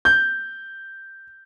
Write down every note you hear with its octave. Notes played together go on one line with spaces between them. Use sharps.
G6